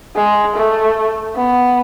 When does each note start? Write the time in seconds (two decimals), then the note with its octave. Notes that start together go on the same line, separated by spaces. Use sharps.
0.16 G#3
0.56 A3
1.36 B3